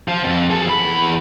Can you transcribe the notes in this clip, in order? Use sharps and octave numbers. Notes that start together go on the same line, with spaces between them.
F3
F2
G#4 A4
E2 B5